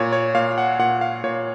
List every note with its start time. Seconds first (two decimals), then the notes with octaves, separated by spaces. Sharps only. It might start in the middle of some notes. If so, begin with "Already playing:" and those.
Already playing: A#2 C#5
0.12 C#5
0.34 A#2 F5
0.58 F#5
0.79 A#2 F#5
1.01 F5
1.24 A#2 C#5